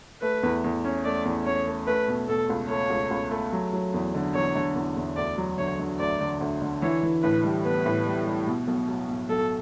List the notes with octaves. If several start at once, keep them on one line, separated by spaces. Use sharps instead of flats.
A3 B4
E2
E2
C#4
A3 D5
E2
C#4 C#5
A3
A3 B4
B2
B2 A4
C#2
A3 C#5
C#2
C#2
A3
F#3
F#3
E2
D3
E2 C#5
D3
E2
E2
D2 D5
F#3
D3 C#5
D3
D2 D5
D3
D2
D3
E3 C#5
E3
A2 B4
G3
B3 B4
A2
G3
G3
B2
B1
F#3
B2
B1 A4